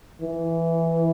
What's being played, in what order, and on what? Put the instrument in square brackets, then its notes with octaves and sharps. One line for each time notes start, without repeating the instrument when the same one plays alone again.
[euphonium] E3